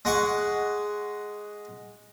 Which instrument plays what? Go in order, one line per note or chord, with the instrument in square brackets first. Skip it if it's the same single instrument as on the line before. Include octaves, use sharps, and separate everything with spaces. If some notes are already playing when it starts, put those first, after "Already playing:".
[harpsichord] G#3 F#5 C#6